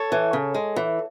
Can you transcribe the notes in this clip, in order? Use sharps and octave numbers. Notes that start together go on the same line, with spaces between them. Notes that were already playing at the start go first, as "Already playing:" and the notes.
Already playing: A4 C#5
E3
C#3
G#3
E3